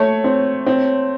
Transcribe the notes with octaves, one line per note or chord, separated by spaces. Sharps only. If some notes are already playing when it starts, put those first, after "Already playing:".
Already playing: A3 C#5
C4
C4